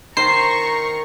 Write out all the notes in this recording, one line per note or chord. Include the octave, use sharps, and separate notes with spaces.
D#3 C5 A#5 C#6 C7